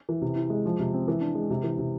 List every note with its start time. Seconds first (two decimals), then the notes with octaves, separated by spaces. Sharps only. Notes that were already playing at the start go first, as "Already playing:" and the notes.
0.09 E3
0.22 C3
0.36 E4
0.50 G#3
0.65 F3
0.80 C3
0.94 C4
1.08 E3
1.21 D4
1.35 G#3
1.50 C3
1.63 E3
1.78 C3